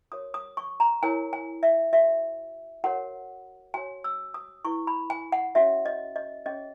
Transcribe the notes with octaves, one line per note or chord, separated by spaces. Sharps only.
F#4 A#4 C#5 D#6
D#6
C#6
A#5
E4 A#4 C#5 G#5
G#5
E5
F#4 A#4 C#5 E5
F#4 A#4 C#5 F#5
F#4 C#5 G#5
E6
D#6
E4 B4 C#6
B5
G#5
F#5
C#4 F#4 C#5 E5
D#5
D#5
C#4 G#4 C#5 D#5